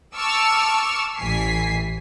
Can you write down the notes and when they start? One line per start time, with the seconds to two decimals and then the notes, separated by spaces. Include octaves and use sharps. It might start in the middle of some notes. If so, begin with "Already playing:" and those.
0.16 A5 C#6 D6 E6 F6
1.18 A1 E3 G#5 B6 C7